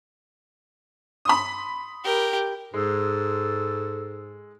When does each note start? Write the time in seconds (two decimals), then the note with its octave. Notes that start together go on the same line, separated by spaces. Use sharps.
1.25 B5 C6 D#6
2.04 G4 A#4
2.74 G#2 G#3 A4